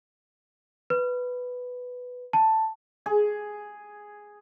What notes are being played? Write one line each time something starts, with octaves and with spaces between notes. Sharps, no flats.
B4
A5
G#4